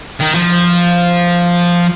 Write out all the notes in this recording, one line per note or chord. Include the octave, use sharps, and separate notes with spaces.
D#3
F3